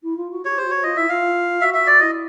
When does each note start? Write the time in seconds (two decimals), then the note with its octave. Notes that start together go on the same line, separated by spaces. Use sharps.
0.02 E4
0.16 F4
0.30 F#4
0.45 G4 C#5
0.57 C5
0.64 F#4
0.70 C#5
0.83 F4 D#5
0.96 E4 E5
1.09 F4 F5
1.61 F#4 E5
1.74 E5
1.87 D5
2.00 E4 D#5